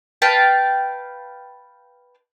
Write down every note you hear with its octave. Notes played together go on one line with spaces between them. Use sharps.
B4 F5 G5 A5